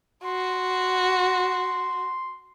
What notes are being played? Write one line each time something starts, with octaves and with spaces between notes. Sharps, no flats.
F#4 C6